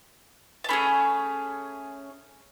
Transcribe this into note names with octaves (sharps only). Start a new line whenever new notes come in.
A5
A3 C#4 G#4 B5